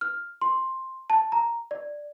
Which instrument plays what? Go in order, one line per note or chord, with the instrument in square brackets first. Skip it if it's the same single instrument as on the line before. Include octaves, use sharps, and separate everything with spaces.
[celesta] F6
C6
A5
A#5
D5